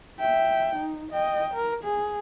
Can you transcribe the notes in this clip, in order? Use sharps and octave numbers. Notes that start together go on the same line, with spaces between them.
E5 G5
D#4
D#5 G5
A#4
G#4